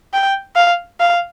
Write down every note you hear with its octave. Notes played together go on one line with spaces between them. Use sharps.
G5
F5
F5